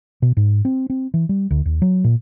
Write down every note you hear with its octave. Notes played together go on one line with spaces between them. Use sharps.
B2
G#2
C4
C4
E3
G3
D2
D#2
F#3
A#2